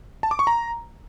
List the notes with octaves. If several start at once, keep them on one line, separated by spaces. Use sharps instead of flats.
A5
D6
C#6
A#5